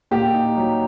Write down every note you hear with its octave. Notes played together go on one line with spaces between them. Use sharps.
A#2 G4
D#4
F#3